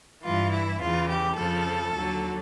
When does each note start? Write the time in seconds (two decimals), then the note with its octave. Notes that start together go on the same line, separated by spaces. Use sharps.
0.23 G2 E3 F4
0.51 E4
0.80 E2 C#3 E3 F4
1.08 G4
1.36 F2 C#3 F3 A4
1.94 D#2 D3 F#3